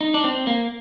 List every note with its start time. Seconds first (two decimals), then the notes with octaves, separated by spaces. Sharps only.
0.01 D#4
0.14 D4
0.24 C4
0.47 A#3